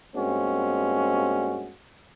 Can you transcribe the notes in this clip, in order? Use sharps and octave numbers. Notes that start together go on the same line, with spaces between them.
G2 G#3 A#3 C4 C#4 F#4